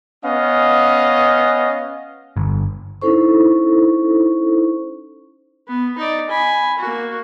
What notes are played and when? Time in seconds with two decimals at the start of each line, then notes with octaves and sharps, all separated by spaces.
0.24 B3 C#4 D#5 F5
2.37 G1
3.02 C#4 D#4 E4 A4 C5 C#6
5.68 B3
5.98 D#4 D5
6.30 G#5 B5
6.79 A#3 F#4